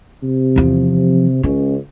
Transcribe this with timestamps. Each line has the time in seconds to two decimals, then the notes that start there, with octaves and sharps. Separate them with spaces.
0.23 C3
0.56 E2 F3
1.43 C#2 C#4